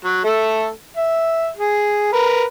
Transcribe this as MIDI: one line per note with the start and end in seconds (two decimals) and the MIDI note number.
0.05 0.24 54
0.24 0.69 57
0.24 0.69 69
0.96 1.49 76
1.57 2.12 68
2.13 2.43 70
2.13 2.43 71